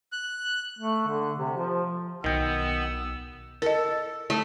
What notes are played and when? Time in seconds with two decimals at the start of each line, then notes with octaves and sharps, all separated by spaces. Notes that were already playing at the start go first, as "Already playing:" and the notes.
0.12 F#6
0.79 A3
1.07 D3
1.38 C3
1.57 F3
2.24 B1 D#3 B3 G5 E6
3.62 A4 A#4 D#5
4.30 A3